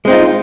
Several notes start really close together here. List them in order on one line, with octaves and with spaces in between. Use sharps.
G#3 C4 D#4 F4